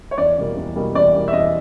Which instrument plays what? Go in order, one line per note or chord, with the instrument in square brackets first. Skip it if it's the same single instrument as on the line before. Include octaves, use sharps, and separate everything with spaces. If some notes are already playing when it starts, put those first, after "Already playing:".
[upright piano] C#5
E2 D5
B2 G3 A#3
E2
B2 G3 A#3
E2 D5
B2 G3 A#3
E5
E2 D#5